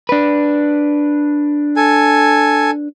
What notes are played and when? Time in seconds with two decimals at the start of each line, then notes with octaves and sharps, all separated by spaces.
0.09 D4 B4
1.76 A4 G#5